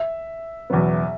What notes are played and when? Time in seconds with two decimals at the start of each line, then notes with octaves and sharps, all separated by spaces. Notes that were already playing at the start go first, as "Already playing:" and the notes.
Already playing: E5
0.70 F#1 E2 B2 F#3 B3